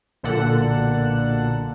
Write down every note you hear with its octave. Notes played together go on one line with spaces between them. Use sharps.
B1 A#2 D3 A4 F#5